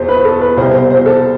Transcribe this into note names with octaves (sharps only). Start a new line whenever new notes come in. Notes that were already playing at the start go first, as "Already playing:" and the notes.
Already playing: E2 B2 C5
B4
A4
B4
C2 B2 C5
C5
C5
A4